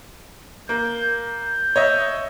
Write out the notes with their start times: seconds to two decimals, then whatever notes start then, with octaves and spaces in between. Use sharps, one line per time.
0.69 A#3 G6
1.25 G6
1.76 C#5 D#5 E5